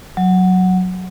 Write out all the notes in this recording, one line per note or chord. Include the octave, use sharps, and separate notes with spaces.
F#3